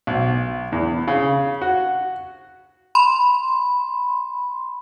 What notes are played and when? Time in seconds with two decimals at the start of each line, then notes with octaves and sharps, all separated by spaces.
0.07 B1
0.72 E2
1.08 C#3
1.61 F#4
2.95 B5 C6